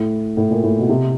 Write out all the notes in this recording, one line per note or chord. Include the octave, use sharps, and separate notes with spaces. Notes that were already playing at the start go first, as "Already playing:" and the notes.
Already playing: A2
A2
A#2
A2
B2
C3